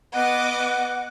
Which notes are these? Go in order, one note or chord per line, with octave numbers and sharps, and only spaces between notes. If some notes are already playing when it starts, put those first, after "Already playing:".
B3 D#5 F#5 D6